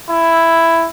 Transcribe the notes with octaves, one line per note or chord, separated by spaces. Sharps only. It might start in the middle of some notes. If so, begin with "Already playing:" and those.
E4